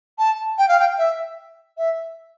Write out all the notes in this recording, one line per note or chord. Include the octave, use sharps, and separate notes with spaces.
A5
G5
F5
G5
E5
E5